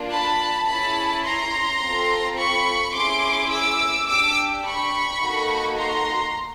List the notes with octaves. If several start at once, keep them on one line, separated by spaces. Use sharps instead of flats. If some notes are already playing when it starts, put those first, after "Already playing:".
Already playing: A#3 D4 F4
A5 B5
C#4 E4 G#4 A5 B5
A#5 C6
C4 F4 A4
B5 C#6
C#4 E4 G#4 C6 D6
D6 E6
D4 G4 D6 E6
B5 C#6
A#3 D#4 F#4 A4
A#5 C6